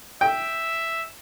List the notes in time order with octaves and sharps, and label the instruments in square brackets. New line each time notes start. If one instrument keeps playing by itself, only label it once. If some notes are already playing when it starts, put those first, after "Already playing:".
[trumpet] E5 [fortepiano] G5